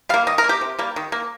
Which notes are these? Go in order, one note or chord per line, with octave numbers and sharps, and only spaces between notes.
G3 A#3 F5
D#3 D#5
A#4
A#3
G4
C3
G3 A#3
D#3
A#3